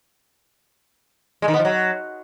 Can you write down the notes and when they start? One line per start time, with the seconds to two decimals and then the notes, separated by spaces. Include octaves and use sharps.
1.42 G#3
1.48 D#3
1.54 B3
1.59 F3
1.65 F#3